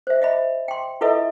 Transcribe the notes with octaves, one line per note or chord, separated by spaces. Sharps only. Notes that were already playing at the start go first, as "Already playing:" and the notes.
C5 E5
D#5 E5 B5
G5 C6
E4 F4 A4 B4 D#5 E5